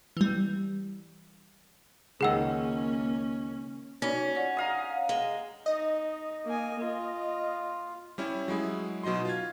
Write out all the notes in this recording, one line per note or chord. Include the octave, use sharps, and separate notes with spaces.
E3 G3
C#2 D#3 A#3 C#4 G#4 F#5 E6
C#4 D#4 F#4 C#5 D5
F4 D5 F#5
D#5 F5 A#5
G#3
D#4 D#5
A#3 G#5
F4
G3 C#4 E4
F#3 G#3 E4 G#4
B2 F#3 D#4 D#5 C6
F4 F5 G#6